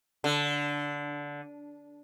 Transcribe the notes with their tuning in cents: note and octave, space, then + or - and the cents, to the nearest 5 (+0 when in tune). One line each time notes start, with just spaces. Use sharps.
D3 -15